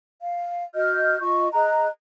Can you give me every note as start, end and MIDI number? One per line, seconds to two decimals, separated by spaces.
0.20 0.64 77
0.75 1.19 66
0.75 1.19 75
0.75 1.19 89
0.75 1.19 91
1.20 1.48 65
1.20 1.48 75
1.20 1.48 85
1.54 1.87 68
1.54 1.87 75
1.54 1.87 82
1.54 1.87 90